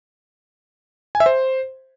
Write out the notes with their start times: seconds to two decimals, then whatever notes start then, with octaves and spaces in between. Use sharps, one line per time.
1.15 G#5
1.20 E5
1.26 C5